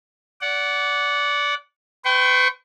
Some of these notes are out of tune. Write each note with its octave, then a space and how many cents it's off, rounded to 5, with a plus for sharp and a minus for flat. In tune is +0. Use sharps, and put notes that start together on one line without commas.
D5 -25 F#5 +0
B4 +35 G5 -25 C#6 -25